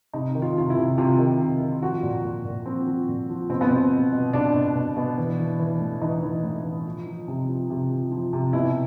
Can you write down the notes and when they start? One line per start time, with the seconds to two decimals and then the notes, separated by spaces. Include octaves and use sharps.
0.13 C3 D#4
0.35 D#3
0.42 F4
0.56 C3 F4
0.70 E4
0.77 C3
0.98 C3 F4
1.19 D#3
1.40 C3
1.61 D#3
1.82 F3 F#4
2.03 A#2
2.24 A#2
2.45 A#2
2.66 F3 C4
2.86 F3
3.08 A#2
3.29 F3
3.49 B2 C4
3.61 B3
3.70 B2 C4
3.91 B2
4.12 B2
4.33 B2 D4
4.55 B2
4.75 B2
4.96 B2
5.18 E3
5.39 E3
5.59 E3
5.80 A2
6.01 E3 D#4
6.22 E3
6.43 A2
6.64 E3
6.85 F3
7.06 F3
7.28 C3
7.49 F3
7.70 C3
7.91 F3
8.11 F3
8.33 C3
8.53 B2 E4